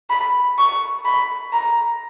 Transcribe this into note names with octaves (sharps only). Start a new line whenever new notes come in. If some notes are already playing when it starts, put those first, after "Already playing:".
B5
C#6
B5
A#5